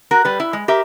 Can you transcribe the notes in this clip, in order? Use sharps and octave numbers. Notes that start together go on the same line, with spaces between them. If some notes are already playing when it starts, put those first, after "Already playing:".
F#4 A#4
G3 B4
E4
G#3
G4 A#4 E5